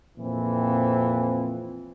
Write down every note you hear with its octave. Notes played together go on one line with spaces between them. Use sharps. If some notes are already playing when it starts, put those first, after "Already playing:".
F2 A#2 E3 F3 C4